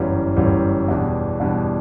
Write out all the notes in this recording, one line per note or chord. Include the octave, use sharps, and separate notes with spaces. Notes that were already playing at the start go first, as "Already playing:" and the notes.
Already playing: G1 F#2 E3 G3
G1 F#2 E3 G3
E2 B2 G3 D4
E2 B2 G3 D4